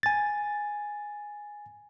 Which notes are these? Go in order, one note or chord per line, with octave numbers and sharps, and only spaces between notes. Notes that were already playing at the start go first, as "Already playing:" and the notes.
G#5 A6